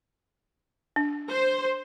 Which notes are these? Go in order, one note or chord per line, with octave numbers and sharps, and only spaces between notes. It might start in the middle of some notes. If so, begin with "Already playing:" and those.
D4
C5